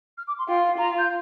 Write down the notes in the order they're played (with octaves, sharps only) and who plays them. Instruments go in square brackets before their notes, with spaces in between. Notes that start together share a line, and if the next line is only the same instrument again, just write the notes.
[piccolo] F6
D6
C6
[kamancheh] F4 [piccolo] G5
[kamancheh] F4 [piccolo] A#5
[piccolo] G6